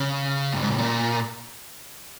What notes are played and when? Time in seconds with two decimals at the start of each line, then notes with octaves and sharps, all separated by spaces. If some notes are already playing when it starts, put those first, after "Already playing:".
Already playing: C#3
0.53 G2
0.62 G#2
0.70 A2
0.78 A#2